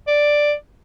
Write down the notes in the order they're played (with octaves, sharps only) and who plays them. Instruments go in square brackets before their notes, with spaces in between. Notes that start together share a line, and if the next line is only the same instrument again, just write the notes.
[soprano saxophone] D5